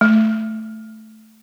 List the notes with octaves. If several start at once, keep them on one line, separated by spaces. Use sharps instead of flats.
A3